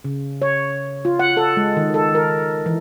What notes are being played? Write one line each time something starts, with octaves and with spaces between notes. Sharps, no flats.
C#3
C#5
F4
F#5
A4
G#3
D#3
A4
A#4
E3